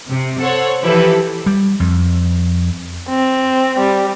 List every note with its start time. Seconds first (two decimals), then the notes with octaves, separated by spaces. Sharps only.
0.10 C3
0.41 A4 C5 C#5 F#5
0.84 E3 F3 E4 G4 A4 B4
1.46 G3
1.80 F2
3.09 C4
3.79 G3